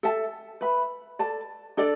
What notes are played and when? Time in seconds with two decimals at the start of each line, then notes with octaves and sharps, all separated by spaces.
0.03 A4 E5 A5
0.61 B4 E5 B5
1.19 A4 D5 A5
1.77 D4 A4 D5